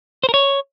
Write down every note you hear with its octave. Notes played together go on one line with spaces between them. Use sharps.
C5
A#4
C#5